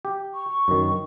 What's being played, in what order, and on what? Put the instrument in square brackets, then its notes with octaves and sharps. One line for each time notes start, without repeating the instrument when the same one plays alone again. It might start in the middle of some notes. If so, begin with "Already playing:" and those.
[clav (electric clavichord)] G4
[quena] C#6
[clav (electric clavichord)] F#2 D#3